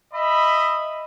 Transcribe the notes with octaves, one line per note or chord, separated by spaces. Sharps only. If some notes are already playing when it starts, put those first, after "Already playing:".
D#5 E5 B5